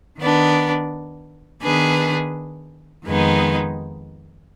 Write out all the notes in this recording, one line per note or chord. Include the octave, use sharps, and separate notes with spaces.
D#3 B3 D4
D#3 B3 D4 G#4 B4
F2 D#3 G#3 B3 D#4